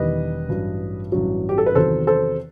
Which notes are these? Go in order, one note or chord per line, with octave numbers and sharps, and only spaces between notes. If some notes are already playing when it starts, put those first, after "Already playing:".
Already playing: E1 E2 D#3 G3 B4 D#5
A1 G2 F#3
A1 G2 F#3
G4
A4
B4
E2 C3 D#3 F#3 A4 C5
A4 C5